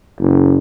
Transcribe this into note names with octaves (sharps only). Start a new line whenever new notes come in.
F#1